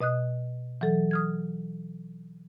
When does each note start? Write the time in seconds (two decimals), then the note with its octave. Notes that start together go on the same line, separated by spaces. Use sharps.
0.01 B2 D#5 D#6 F#6
0.81 E3 F#3 A4
1.11 D#6 F6 G#6